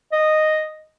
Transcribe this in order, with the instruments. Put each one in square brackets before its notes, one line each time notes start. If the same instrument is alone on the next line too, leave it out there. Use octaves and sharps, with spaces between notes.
[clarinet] D#5